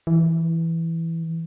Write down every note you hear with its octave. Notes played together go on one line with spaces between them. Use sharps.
E3